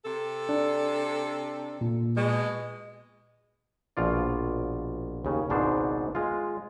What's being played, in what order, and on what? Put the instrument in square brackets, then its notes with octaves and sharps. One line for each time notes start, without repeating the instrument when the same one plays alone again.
[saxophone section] C3 A4
[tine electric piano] D4
A#2
[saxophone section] B2 G#3
[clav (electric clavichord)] A#1 B2 F4 D5
D#2 C#3
G#1 C#2 G#2 B2 D4 C5
G#3 F4